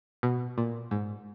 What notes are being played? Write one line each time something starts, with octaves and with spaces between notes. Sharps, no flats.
B2
A#2
G#2